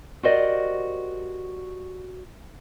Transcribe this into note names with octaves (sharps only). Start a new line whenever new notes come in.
F#4 G4 A#4 C5 D5 D#5